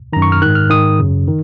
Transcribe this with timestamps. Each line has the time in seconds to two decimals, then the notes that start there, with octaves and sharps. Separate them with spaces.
0.13 F#2 D#3 A#5
0.22 C#6
0.32 F6
0.41 G#2 D#3 F#6
0.55 F6
0.70 G#2 D#3 D#6
0.99 F#2 C#3
1.28 D#3